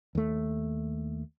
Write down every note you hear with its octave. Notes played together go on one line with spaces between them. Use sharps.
D#2 A3